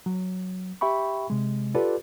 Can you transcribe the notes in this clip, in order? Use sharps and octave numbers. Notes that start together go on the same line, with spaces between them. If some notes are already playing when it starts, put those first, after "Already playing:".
F#3
G4 E5 G5 B5 C#6
C3 G#3
F4 G4 A4 B4 D5